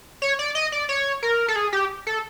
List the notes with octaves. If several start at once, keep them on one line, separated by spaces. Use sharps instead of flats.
C#5
D5
D#5
D5
C#5
A#4
A4
G#4
G4
A4